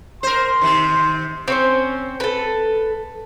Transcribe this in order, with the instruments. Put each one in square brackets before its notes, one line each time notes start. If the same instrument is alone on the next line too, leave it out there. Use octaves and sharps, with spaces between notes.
[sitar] A#4 C5 [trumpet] C6
[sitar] C3 D#3
[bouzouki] C4 C#4 C5
A4 B4